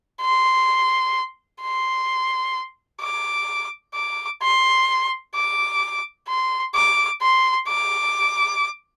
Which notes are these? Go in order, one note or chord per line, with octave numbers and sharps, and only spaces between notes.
C6
C6
D6
D6
C6
D6
C6
D6
C6
D6